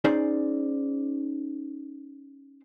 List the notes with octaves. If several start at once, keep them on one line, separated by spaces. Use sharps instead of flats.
C#4 D#4 G#4 C5 D5